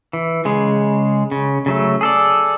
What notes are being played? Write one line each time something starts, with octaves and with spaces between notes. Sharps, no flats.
E3
C#3 G#3
C#3
C#3 F#3 A3
G#4 A4 D5